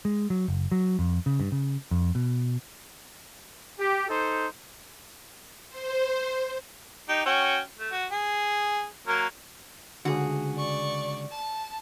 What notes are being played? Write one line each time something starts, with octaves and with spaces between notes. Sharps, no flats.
G#3
F#3
F#1
F#3
F2
C#3
G2
C#3
F2
B2
G4
D#4 A4 C5
C5
D#4 G4
C#4 F#4 G5
A3
F#4
G#4
F#3 A#3 A#4
C#2 D3 F#4 G#4
D5 C#6
A5